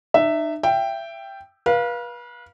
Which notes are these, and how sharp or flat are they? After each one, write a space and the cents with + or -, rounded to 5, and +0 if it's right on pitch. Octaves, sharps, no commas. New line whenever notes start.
D#4 -40 E5 +0
E5 +25 G5 +0
B4 -35 F5 +0